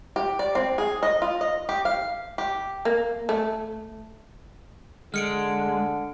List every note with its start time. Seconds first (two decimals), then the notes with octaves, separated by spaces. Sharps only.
0.16 G4
0.39 D5
0.55 C4
0.78 G#4
1.03 D#5
1.22 F4
1.41 D#5
1.69 G4
1.85 F5
2.38 G4
2.85 A#3
3.29 A3
5.14 D3 G#3 F6 C#7 D7